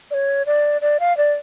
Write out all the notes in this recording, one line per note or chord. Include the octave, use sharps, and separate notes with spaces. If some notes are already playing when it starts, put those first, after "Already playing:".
D5
C#5
D5
D5
F5
D5